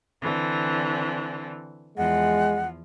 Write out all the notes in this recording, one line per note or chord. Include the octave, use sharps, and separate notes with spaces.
D3 E3 C4
E2 F3 G#3 F#5